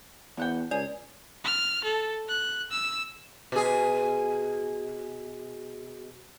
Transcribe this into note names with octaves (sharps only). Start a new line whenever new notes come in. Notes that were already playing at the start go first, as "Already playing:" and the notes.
E2 B2 F#5 G5
C#2 G#4 D5
F6
A4
F#6
E6
B2 G#4